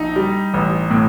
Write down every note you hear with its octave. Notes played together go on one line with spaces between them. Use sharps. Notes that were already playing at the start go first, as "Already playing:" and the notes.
Already playing: A#1 D#4
G3
A1
A2